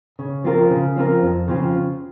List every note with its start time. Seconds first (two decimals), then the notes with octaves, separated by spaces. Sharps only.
0.19 C#3
0.44 F3 C4 F4 A#4
0.70 C#3
0.96 F3 C4 F4 A#4
1.23 F2
1.48 C#3 F3 C4 F4